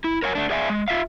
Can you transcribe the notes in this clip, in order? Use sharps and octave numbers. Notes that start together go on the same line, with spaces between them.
E4
A#4 C#5 F5 G#5
A3 D4
G#4 D5 E5 F5 G#5
G#3
F4 E5 F5